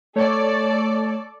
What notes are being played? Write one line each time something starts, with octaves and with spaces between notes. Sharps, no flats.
A3 A4 C#5 D5